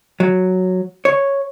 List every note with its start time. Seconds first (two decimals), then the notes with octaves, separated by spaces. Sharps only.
0.20 F#3
1.05 C#5